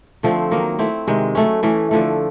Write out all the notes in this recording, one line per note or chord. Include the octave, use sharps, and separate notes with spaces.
D3 F3 A3 C4
D#3 F#3 A#3 D#4
A3 C4 E4
C3 D#3 G#3
F#3 A3 C#4
E3 A3 C#4
D3 F3 A3